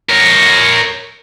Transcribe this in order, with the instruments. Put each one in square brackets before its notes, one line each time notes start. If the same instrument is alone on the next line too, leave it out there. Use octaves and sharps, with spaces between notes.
[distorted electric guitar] A#4 C#5